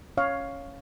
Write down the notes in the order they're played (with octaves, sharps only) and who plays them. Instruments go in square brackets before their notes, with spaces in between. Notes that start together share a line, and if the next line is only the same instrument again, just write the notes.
[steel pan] C#4 C#5 F5